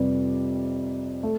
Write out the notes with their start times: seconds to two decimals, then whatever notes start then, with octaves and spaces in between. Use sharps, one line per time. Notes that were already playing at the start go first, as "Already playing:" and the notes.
Already playing: F2 C3 G3 B4 D5
1.23 A3